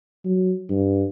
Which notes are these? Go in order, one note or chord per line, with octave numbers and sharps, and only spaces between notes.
F#3
G2